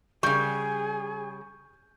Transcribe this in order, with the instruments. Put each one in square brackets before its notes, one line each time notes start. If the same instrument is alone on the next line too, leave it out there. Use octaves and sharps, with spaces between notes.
[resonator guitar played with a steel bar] C#3 G3 [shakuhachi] G#4 [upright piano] C#6 G6